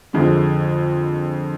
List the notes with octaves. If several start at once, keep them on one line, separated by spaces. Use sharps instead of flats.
F2 D3 G#3